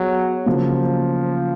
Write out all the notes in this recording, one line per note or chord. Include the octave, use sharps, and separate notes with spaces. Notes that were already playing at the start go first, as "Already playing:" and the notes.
Already playing: F#3 B3 G#4
C#3 F3 F#3 A#3